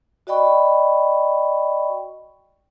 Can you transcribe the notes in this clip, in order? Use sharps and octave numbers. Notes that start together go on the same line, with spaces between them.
F#4 D5 D#5 G5 B5 C#6